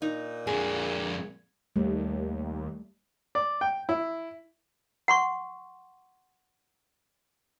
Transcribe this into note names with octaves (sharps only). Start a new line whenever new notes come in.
A#2 D#4
F2 D3 G#4
D#2 G3 A3
D5
G5
E4
F#5 C6 C#6